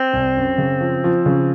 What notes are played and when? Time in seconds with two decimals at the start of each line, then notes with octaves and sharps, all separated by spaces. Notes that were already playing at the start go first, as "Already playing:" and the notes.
Already playing: C4
0.13 C2
0.37 F#2
0.58 C#3
0.81 F3
1.04 F3
1.26 C#3